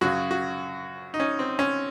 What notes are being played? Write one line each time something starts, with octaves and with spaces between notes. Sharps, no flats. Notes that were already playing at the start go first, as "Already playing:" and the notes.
F#2 C#3 F#4
F#4
D#4
C#4
C4
C#4